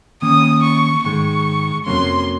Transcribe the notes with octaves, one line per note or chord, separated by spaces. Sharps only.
D#3 A#3 C#4 D#6
C#6
G#2 D#3 G#3 C#6
F2 C3 F#3 A#3 C#4 C6